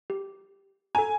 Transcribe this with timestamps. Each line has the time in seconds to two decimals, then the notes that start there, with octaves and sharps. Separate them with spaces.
0.10 G4
0.95 A4 G#5 A#5